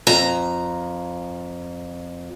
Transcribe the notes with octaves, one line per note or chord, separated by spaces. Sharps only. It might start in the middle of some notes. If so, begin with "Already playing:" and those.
F2 A#5